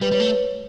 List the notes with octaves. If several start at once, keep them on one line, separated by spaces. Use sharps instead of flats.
G3 B4
G3 C#5
A3